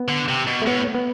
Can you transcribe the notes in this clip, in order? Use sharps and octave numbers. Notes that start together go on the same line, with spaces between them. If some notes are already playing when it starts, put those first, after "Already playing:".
Already playing: B3
D3
C3
B2
A3
A2 B3
B3